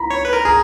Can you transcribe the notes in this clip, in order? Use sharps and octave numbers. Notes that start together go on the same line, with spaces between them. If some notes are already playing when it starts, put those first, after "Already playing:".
Already playing: A#5 B5
C#5
B4
A#4
G#4 A#5